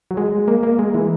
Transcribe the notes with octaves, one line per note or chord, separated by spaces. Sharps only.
F#3
G#3
A#3
A#3
G#3
E3